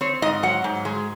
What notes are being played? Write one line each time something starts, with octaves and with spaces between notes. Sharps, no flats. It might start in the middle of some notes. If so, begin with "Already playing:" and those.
C4 C#5
G#2 D#5
F#3 F#5
G#2
G#3